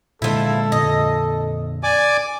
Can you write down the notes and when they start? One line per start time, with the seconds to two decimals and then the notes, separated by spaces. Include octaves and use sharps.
0.22 A#2 D3 F3 G#3 E4 A4
0.72 F2 A#2 D3 D#5
1.83 D5 G#5 D6